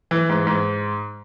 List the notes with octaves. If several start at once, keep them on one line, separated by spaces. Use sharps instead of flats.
E3
G#2
G#2